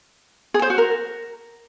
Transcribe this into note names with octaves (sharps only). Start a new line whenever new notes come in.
G#4
C5
F#4
A#4